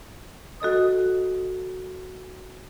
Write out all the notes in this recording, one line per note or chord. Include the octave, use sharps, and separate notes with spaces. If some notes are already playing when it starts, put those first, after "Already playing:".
F#4 A4 D#5 D#6